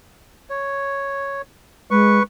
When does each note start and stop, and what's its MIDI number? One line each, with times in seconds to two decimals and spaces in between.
0.50 1.42 73
1.91 2.19 56
1.91 2.23 71
1.91 2.23 85